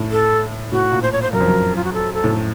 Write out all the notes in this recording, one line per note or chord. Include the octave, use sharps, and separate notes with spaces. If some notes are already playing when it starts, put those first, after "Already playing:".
Already playing: A2
A4
A2 F#4
A#2
C5
C#5
C5
F#2 A#4
F2
F#2
F4
F#4
A4
A4
A2